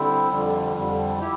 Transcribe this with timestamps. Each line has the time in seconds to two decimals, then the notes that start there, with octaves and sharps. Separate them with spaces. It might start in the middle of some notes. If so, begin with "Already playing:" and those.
Already playing: D3 G3 C4 E4
0.29 F2 D3 G3
0.75 F2 D3 G3
1.20 E4 G4